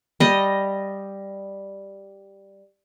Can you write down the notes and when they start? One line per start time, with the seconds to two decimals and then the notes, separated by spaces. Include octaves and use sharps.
0.20 G3 D#5